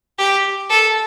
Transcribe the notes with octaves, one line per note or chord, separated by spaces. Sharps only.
G4
A4